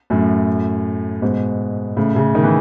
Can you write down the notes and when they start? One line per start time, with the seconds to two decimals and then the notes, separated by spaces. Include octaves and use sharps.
0.10 F#2 A2
1.22 G#2 B2
1.97 A2 C#3
2.15 A2 C#3
2.35 D#3
2.43 E3